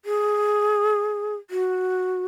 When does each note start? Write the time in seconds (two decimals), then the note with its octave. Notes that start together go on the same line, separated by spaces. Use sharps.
0.05 G#4
1.50 F#4